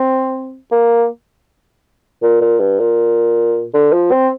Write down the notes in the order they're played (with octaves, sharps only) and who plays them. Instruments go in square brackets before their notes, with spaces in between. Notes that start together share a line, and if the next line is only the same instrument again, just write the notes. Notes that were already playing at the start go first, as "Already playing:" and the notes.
Already playing: [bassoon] C4
A#3
A#2
A#2
G2
A#2
D3
F3
C4